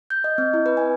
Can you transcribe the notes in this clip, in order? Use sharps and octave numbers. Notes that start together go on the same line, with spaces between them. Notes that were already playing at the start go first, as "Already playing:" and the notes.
G6
D#5
C4
E4
B4
G#5